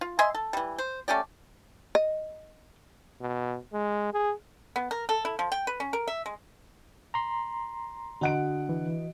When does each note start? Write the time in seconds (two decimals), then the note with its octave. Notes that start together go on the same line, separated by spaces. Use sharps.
0.01 F4
0.19 D#5 E5 G#5 C6
0.35 A4
0.53 E3 G3
0.78 C5
1.08 A3 C#4 G4 D5
1.95 D#5
3.21 B2
3.73 G#3
4.13 G#4
4.76 B3
4.91 A#4
5.09 A4
5.25 E4
5.39 F3
5.52 G5
5.67 B4
5.80 C#4
5.93 A#4
6.08 E5
6.26 G#3
7.14 A#5 C6
8.21 D3 F#4 D#5 F#5 D7
8.69 E3